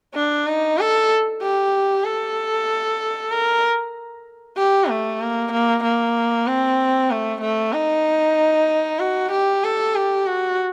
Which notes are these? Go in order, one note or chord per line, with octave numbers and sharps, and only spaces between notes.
D4
D#4
A4
G4
A4
A#4
G4
A3
A#3
A#3
A#3
C4
A3
A3
D#4
F#4
G4
A4
G4
F#4